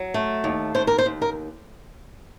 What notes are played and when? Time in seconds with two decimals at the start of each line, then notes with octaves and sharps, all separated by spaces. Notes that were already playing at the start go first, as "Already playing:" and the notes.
Already playing: F#3
0.14 A3
0.44 D#2
0.75 D#2 C5
0.87 A#4
0.98 C5
1.06 D#2
1.22 A#4